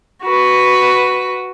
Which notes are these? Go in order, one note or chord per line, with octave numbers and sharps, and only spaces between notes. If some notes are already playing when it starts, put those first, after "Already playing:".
F#4 B4